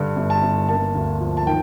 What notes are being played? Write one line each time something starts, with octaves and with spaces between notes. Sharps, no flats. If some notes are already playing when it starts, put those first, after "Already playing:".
Already playing: G2 D3
G1
A5
G1
A#3 A5
D2
F3
A5
D#3 G5